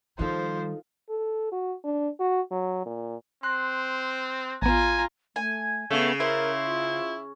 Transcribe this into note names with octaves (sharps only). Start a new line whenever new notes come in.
D#3 F3 G3 D#4 A4 C5
A4
F#4
D4
F#4
F#3
A#2
C4 C6 F#6
A1 B3 F4 G#5 A#5
A3 G#5
C#3 A3 B3
E4 A#4 C5
F4